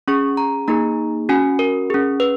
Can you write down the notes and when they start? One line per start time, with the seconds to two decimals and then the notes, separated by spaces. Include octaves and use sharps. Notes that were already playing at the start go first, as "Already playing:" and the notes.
0.08 C#4 G#4 C#6
0.37 A#5
0.68 A#3 D#4 G#4 A#5
1.29 C#4 F#4 G#5
1.59 A#4
1.90 C#4 G#4
2.20 B4